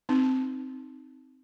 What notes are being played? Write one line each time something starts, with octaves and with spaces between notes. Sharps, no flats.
C4 D#4